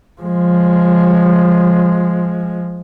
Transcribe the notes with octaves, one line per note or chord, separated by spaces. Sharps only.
F3 G#3